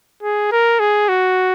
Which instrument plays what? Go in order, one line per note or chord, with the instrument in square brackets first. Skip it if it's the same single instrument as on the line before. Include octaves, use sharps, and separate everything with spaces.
[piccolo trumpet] G#4
A#4
G#4
F#4